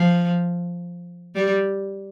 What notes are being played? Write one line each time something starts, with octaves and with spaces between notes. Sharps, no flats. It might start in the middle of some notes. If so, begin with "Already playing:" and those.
Already playing: F3
G3